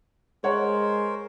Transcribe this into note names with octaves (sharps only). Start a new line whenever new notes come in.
G#3 A#4 C5 C#5 F#5